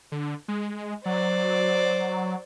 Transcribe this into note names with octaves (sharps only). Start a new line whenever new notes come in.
D3
G#3
F#3 C5 D5